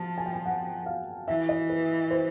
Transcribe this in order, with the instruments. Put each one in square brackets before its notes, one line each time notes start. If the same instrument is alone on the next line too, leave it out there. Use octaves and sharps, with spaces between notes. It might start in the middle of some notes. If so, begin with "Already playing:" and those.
Already playing: [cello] F3 [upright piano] A5
[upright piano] G#5
G5
G#5
F#5
F5
[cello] E3 [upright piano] E5
[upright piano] D#5
B4
C5